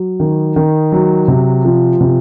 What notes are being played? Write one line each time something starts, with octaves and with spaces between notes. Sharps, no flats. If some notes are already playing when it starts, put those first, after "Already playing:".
Already playing: F#3
D#3
D#3
F#3
C3
F3
C3